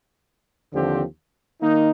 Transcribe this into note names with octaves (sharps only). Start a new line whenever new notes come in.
D#2 D3 F3 C4 G4
D#3 A#3 D#4